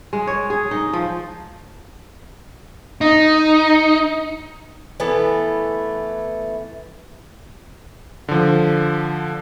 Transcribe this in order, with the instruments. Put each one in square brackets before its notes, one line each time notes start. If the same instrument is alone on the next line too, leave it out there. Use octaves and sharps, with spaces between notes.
[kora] G#3
C#5
G#4
D#4
F3
[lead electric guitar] D#4
[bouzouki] E3 A3 B3
[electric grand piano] D3 F3